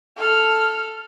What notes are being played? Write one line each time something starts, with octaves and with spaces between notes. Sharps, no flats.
A4 F6